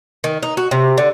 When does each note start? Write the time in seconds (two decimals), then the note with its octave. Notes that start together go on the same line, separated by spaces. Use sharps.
0.24 D#3
0.43 D#4
0.57 F#4
0.71 C3
0.98 D3